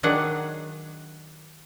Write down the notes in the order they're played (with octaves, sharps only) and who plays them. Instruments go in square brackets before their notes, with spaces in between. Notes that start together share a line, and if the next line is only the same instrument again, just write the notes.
[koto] D#3 F#3 D4 G#4 F#5